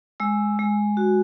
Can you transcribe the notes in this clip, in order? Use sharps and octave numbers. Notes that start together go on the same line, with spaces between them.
G#3 E6
G#3
F#4